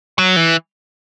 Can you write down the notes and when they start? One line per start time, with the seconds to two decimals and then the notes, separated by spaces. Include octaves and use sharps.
0.18 F#3
0.36 E3